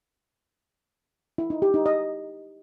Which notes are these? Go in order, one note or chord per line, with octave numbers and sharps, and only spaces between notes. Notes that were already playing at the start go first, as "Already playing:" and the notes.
E4
D#4
G4
D#4
D#5